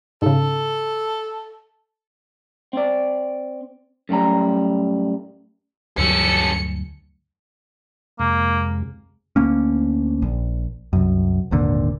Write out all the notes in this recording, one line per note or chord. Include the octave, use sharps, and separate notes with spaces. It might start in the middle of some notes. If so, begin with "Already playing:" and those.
G#2 C#3 A4
C4 D5
F#2 A2 G3 A#5
D2 G2 F#3 C#4 A4 C#7
F2 C3 G#3 A#3
D2 A#3 C#4
A#1
C2 F#2
D#1 G#1 A#2 D3